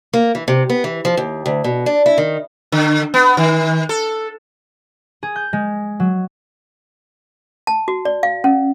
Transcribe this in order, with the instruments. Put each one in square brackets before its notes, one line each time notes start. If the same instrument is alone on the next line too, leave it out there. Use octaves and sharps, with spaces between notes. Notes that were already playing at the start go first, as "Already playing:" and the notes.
[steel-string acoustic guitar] A#3
E3
C3
B3
E3
F3
D#2
D2
B2
D4
E4
D#3
[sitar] D3
B3
D#3
A4
[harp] G#4
G6
G#3
F#3
[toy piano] A5
F#4
D5
F5
C#4